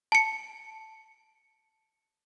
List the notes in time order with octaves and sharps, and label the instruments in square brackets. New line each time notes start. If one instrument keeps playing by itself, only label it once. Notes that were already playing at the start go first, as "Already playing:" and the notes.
[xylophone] A5 C#7